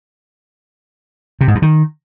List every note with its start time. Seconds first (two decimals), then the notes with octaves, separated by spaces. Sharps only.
1.41 C3
1.48 G#2
1.55 G2
1.62 D#3